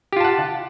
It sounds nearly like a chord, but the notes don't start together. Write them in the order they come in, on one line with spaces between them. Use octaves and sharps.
G4 F4 A5 F#5